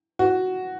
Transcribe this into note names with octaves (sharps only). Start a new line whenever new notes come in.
F#4